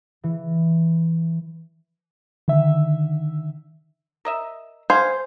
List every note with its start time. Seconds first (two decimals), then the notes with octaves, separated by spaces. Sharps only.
0.24 E3
2.48 D3 D#3 E5
4.25 A#4 D#5 E5
4.90 G#4 C5 F5 G#5